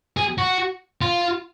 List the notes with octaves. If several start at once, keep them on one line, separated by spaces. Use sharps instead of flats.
G#4
F#4
F4